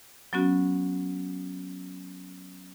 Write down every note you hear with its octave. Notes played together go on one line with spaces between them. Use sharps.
F#3 B3 C#4 F#4